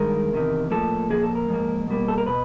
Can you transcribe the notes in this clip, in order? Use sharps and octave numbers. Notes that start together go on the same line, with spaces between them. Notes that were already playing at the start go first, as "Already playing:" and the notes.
Already playing: G2 D#3 G#3 A#4
E2 C3 D#3
A2 F3 A#3 A4
A#2 F3 A#3 G#4
A4
A#4
G#2 F3 A#3
B2 G3 A#3
A4
A#4
B2 B4